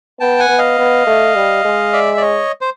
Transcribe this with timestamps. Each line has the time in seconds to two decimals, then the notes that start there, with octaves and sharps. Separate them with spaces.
0.20 B3 G5 A5
0.39 F#5 G#5
0.49 B3
0.58 D#5 F5
0.79 B3
1.06 A3
1.35 G3
1.65 G#3
1.93 D5 E5
2.17 D5
2.21 C#5 D#5
2.61 C5